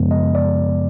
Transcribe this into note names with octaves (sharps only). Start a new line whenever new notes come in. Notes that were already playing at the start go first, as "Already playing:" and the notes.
Already playing: F#2 C#3 F3 G#3 B3
D#5
D5